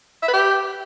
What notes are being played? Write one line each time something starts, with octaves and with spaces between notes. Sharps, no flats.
E5
B4
G4